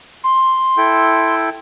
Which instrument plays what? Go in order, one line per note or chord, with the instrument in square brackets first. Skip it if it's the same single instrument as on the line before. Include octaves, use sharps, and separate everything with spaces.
[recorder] C6
[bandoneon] E4 A4 G5